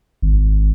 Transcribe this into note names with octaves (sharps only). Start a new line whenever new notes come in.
G#1